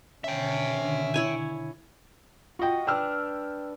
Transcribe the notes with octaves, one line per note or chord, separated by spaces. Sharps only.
B2 D3 D#3 C#4 E5 G5
E4 C#5 G#5
F4 F#4 D#5 G5
D4 B4 G5 E6 F6